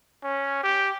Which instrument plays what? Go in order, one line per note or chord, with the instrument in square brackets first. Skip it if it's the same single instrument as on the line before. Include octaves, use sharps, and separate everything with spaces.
[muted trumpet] C#4
G4